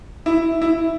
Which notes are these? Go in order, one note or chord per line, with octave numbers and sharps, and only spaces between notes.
E4
E4